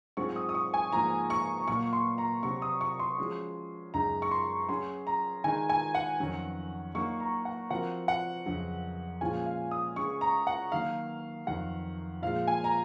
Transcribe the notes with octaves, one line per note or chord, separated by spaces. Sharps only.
G#2 F#3 C4 F4 G#4 C#6
D#6
D#6
C#6
G#5
G#2 F3 A#3 A#5
C#6
A#2 F#3 A#3 C#6
C6
A#5
C3 F#3 C4 C#6
D#6
C#6
C6
F3 G#3 C#4 F#4
F#2 C#3 G#3 D#4 A#5
C#6
C6
F#3 C#4 G#4 C6
A#5
D#3 G#3 D#4 G#5
G#5
F#5
F2 D#3 F#3 C#4
F#3 A#3 D#4 C#6
A#5
F#5
F3 C4 F#4 A#4 F#5
F#5
F2 C#3 F#3
A#2 F3 G#3 C#4 F4 G#5
F5
D#6
C#3 G#3 C#4 G#4 C#6
A#5
F#5
D#3 F#3 A#3 F5
F2 D#3 F#3 F#5
A#2 F3 G#3 F5
G#5
A#5